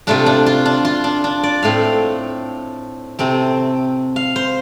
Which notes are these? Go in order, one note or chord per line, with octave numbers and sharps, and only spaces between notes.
C3 A3 D4 F4
D4
F4
D4
F4
D4
D4
D5
A2 A3 C4 F5
C3 A3 C4
F5
C5